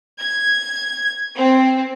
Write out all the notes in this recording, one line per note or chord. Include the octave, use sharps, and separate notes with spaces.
G#6
C4